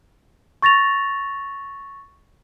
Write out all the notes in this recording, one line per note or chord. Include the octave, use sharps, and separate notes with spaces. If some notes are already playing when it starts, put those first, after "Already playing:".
C#6 A6 A#6 F7